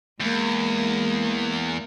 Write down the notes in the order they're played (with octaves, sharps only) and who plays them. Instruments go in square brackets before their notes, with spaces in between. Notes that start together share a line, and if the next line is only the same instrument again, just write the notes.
[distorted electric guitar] E2 [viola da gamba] G#3 A#3